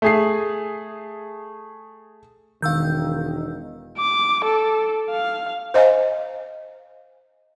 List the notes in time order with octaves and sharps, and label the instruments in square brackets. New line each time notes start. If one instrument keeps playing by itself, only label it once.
[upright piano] A3 G#4 C7
[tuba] E1 [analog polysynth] D#3 [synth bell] F5 E6 G6
[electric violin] D6
A4
F5
[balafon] C5 D#5 F5 G#5